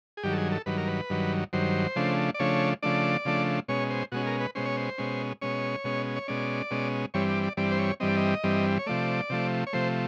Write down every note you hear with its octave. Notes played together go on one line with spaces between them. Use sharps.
G#4
G2 D#3 F#3 G4
A4
G#4
A4
G2 D#3 F#3 B4
A#4
B4
G2 D#3 F#3
G2 D#3 F#3 C5
C#3 F3 A3 D4
D5
C#3 F3 A3 D4 C#5
C#3 F3 A3 D4 D5
C#3 F3 A3 D4
B2 G#3 C#4 C#5
C5
B2 G#3 C#4 F#4
A#4
B4
B2 G#3 C#4 C5
C#5
C5
B2 G#3 C#4
B2 G#3 C#4 C#5
B2 G#3 C#4
C#5
B2 G#3 C#4 D5
B2 G#3 C#4
G2 E3 G3 C4 C#5
D5
D5
G2 E3 G3 C4 D5
C5
C#5
G2 E3 G3 C4 D#5
D5
D#5
G2 E3 G3 C4
C#5
C3 F3 A3 D5
C3 F3 A3
C#5
C3 F3 A3 C5